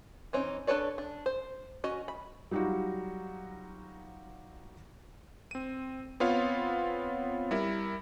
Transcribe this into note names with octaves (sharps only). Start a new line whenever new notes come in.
E3 C4 C#4 D#4
D4 A4 B4 C#5 D5
D4
C5
C#4 F#4 D#5
B5
F#3 G3 D#4 F4 F#4
C4 D#7
B3 C4 F4 C#5 F5
G3 E4 A#4